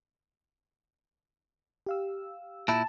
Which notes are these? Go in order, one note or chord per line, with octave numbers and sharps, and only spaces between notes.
G4 F5 E6
A#2 E4 A5